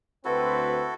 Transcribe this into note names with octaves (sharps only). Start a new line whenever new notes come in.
D2 C4 E4 F#4 A4 B4